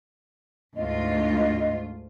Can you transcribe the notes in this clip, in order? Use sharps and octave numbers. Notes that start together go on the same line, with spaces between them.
D2 G#2 F4 D#5